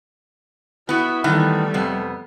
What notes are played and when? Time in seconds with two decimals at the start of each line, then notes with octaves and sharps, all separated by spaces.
0.89 B3 E4 F#4
1.24 D#3 E3 G3 A3 B3
1.74 F2 C3 B3